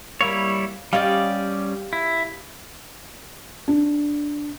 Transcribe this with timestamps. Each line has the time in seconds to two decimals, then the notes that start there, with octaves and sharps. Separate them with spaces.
0.21 G3 A#3 E4 C#5
0.93 G3 C#4 G4 D5 D#5 F5
1.93 E4
3.68 D4